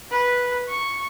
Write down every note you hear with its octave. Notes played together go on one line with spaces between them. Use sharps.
B4
C#6